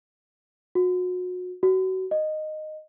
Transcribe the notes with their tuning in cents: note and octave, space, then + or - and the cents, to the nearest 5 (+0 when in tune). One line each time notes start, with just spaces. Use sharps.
F#4 -30
F#4 +25
D#5 -10